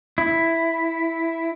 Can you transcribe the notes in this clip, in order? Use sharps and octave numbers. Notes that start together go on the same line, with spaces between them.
E4